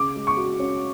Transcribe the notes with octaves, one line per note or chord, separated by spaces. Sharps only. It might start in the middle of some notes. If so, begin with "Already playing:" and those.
Already playing: C#3 D6
G#3
C#6
F#4
C#4